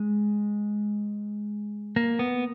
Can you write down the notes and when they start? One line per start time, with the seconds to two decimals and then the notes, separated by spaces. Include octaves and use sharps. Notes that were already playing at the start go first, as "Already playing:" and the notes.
Already playing: G#3
1.96 A#3
2.19 B3